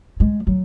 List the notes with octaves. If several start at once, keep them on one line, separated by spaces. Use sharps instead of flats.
G#3
F#3